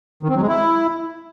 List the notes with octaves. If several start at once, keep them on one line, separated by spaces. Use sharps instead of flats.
D#3
C4
F#3
G#3
E4